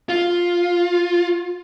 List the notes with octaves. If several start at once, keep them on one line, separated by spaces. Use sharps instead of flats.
F4